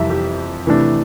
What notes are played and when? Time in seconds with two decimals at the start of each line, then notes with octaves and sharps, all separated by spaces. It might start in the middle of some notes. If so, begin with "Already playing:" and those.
Already playing: F2 C3 E3 G3 E5
0.10 G4
0.66 C3 E3 A3 D4